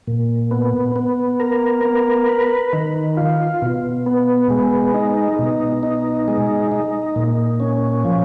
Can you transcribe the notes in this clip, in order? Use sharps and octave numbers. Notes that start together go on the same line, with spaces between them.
A#2
B3
B3
A#4
B3
B4
D#3
F4
B2
B3
G#3
D#4
B2
D#4
G#3
D#4
A#2
C#4
F3